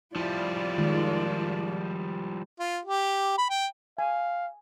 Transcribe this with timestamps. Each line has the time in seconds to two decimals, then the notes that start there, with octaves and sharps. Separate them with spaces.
0.16 F3 G3 E4 F4 D5
0.78 D#3 G#3
2.60 F4
2.85 G4
3.38 B5
3.50 G5
3.98 F5 G#5